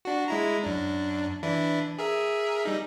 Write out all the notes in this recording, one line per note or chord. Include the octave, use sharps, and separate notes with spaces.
D4 F#4
G#3 E4 A#5
F#2 D4
E3 D4 E4
G#4 A#4 E5
G3 D#4